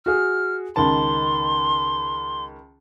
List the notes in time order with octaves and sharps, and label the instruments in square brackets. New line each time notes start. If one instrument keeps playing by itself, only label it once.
[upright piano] F#4 G#4 [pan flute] F6
[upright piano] C#2 D#3 A5 [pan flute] C6